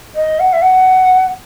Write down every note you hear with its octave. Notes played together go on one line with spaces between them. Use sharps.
D#5
F#5
E5
F#5